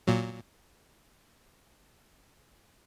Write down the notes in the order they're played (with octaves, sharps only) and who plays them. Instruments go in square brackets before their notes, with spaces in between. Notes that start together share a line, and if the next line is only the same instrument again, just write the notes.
[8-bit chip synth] A#2 F#3